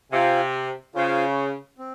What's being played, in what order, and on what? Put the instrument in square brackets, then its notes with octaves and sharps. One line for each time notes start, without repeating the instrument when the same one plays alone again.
[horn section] C3 [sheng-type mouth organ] F4 C5 F5 G#5
[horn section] C#3 [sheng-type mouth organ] F4 C5 F5 G#5
[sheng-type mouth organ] C4